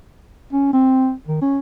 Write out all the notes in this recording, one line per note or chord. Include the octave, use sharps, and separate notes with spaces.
C#4
C4
D#3
C#4